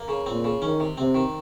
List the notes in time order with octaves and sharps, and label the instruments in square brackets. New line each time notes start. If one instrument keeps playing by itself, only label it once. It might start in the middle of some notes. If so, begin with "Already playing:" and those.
Already playing: [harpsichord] A#3
C#3
[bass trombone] A#2 [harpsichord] C4
[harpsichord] C#3
[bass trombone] D#3 [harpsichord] C#4
[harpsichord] C3
[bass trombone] C3 [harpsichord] C4
[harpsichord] D#3